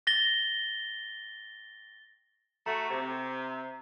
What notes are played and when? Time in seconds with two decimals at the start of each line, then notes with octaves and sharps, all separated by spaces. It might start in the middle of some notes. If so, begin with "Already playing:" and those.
0.07 A6 A#6 G7
2.66 A3 F#4 A#5
2.89 C3